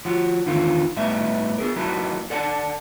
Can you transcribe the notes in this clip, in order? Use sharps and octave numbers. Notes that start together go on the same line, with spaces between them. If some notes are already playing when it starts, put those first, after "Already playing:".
F3 F#4
E2 D3 D#3 F4
A2 G3 B3 D#4 E5
B3 G#4 A#4
F#3 A#3 D#4 E4 F#4
A4 D5 F#5 G#5 A5